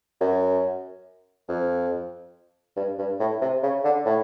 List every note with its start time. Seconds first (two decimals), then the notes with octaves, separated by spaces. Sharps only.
0.21 F#2
1.49 F2
2.77 G2
2.99 G2
3.19 A2
3.41 C3
3.63 C#3
3.84 D3
4.06 A2